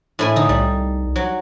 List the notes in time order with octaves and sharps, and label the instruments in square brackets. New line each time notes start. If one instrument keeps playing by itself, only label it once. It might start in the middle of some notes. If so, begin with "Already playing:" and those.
[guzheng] A2 E4 G#5
[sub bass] D3 [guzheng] D#4
[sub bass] C2 [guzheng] G3
[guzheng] F#3